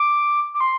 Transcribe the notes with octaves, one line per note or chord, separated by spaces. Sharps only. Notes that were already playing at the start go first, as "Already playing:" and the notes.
Already playing: D6
D6
C6